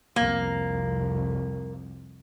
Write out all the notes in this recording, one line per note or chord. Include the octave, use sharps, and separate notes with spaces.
C2 F2 A#3